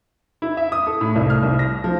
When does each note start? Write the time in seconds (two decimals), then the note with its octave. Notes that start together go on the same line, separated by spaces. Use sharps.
0.42 E4
0.57 E5
0.72 D#6
0.87 A4
1.01 A2
1.16 C2
1.30 F6
1.43 C2
1.59 A#6
1.84 F3